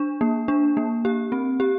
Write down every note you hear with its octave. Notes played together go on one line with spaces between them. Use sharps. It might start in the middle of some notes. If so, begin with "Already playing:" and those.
Already playing: D4
A#3
D4
A#3
G4
C4
G4